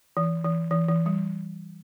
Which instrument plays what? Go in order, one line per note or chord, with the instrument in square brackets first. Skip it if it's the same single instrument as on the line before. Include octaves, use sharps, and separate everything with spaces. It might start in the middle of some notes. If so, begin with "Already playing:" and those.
[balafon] E3
E3
E3
E3
G3